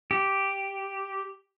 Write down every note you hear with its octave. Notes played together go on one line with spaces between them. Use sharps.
G4